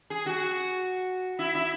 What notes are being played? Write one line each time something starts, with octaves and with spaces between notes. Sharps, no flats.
G#4
F#4
E4
E4